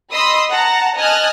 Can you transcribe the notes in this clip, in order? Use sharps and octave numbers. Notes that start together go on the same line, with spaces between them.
D#5 B5 C6 D#6 E6
F#5 A5 A#5
D#5 G#5 A5 D#6 F6 F#6